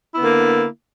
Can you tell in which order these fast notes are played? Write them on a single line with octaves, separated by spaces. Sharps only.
E4 B3 D3 A#3